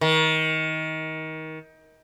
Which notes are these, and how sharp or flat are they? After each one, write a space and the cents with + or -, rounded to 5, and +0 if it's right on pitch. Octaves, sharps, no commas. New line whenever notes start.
D#3 +25